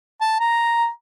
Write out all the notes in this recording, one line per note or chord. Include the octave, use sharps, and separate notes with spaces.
A5
A#5